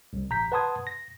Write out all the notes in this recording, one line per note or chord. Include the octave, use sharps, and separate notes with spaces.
C2
A1 A#5 G6 B6
B4 F#5 A5 C6 D#6 G#6
A#6